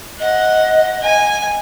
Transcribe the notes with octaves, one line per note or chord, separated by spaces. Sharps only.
D#5 F#5
G#5